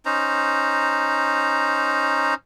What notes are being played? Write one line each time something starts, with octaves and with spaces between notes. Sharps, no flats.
C#4 D#4 C5 A#5